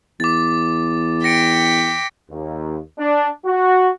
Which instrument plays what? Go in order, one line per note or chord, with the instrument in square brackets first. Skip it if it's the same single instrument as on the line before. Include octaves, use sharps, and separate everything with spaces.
[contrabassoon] E2 [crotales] D6 A6
[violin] G5 B6 [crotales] A#6 C#7 D7
[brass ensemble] D#2
D4
F#4